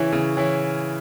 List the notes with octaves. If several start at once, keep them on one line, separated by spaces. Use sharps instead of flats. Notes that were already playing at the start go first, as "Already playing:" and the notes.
Already playing: C#3 E3 C#4 E4
C#3
E3 C#4 E4